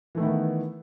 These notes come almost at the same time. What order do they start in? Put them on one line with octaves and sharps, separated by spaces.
E3 A3 D#3 E4 B3